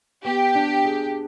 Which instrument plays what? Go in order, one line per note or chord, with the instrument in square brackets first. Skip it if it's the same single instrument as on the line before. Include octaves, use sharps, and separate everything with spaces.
[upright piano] B3 [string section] G4
[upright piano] D4
G#4